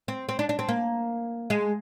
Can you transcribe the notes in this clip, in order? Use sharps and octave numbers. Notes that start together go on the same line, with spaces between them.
C4
C4
D4
D4
C4
A#3
G#3